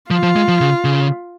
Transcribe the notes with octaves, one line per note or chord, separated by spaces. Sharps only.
F3 F4
F3
G#3
F3
C#3
C#3